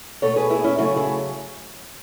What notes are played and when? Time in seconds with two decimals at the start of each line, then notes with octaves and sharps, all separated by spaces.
0.22 B2 A3 A4 C#5
0.36 G#4 B4
0.50 E4 G#4
0.64 C#4 E4
0.78 C#3 F#3 A3 C#4 E4
0.97 E4 G#4